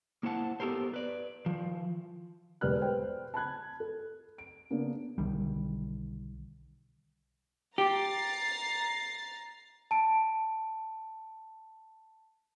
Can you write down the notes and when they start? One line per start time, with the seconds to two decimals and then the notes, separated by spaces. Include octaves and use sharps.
0.23 A#3 E4 C5 F#5 A5
0.60 B3 G4 A4 A#4 C5
0.94 B4 D5
1.46 D#3 F3
2.61 E1 G4 B4 D5 F6 F#6
2.81 B4 C5 G5
3.34 A5 B5 F#6 G#6
3.80 A4
4.38 D7
4.70 C#3 A#3 B3 D4
5.18 B1 D3 D#3 G3
7.78 G4 A#5 A6 C7
9.91 A5 D7